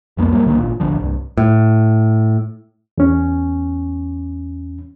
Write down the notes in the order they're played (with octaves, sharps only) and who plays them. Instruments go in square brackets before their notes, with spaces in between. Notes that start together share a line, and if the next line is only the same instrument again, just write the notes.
[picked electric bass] C2 F2 A#3 B3
G#2 F#3 G3 A#3
C2 D3 D#3 A#3
G#1 A#2
A1 D2 D3 F3
C2 G2
A2
[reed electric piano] E2 C#4